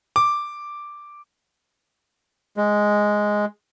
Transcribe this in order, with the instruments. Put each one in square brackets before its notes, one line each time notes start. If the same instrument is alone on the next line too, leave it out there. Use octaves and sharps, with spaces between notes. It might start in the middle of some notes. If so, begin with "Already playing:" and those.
[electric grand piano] D6
[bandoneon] G#3